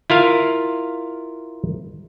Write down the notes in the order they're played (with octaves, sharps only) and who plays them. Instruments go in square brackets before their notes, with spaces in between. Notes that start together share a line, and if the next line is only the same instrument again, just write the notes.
[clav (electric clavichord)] E4 F4 A#4 F5